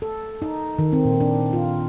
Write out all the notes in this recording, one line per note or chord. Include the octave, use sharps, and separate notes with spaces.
A4
D#4
D#3
C4
A#2
D4
F4